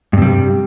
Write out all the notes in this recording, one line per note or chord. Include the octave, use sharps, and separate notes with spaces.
G2 C3 G3